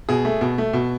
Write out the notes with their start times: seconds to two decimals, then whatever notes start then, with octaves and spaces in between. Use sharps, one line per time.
0.09 B2 G#4
0.25 A3
0.41 B2
0.58 A3
0.73 B2